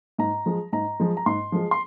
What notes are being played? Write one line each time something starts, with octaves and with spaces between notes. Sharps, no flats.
G#2 A#5
F3 G#3
G#2 A#5
F3 G#3
A#5
G#2 C6
F3 G#3
C6